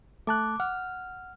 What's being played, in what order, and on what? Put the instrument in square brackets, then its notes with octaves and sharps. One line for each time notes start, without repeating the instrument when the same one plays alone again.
[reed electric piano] A3 A5 F#6 [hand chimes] D6
[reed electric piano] F#5 [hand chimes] F6